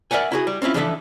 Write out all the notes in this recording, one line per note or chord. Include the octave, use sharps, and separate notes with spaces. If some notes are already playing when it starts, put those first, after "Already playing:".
A#4 D5 E5 F#5 G#5
E4 F#4 G#4
G3
C4 C#4 E4 F4
E3 F3 D4 A4 D5 E5